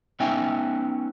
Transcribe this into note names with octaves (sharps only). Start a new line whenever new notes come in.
B3 C#4 D#4 E5 G5 G#5